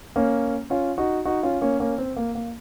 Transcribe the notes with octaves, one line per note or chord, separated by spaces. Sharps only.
A#3 C#4
C#4 F4
D#4 F#4
D#4 F#4
C#4 F4
A#3 C#4
A#3 C#4
C4
A#3
A#3